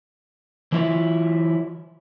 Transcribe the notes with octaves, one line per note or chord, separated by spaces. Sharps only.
E3 F#3 E4 F4 E5